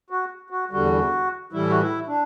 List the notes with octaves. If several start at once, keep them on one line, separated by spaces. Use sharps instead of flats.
F#4
F#4
E2 D3 G3 F#4
A2 E3 G3 E4
F#4
E4
D4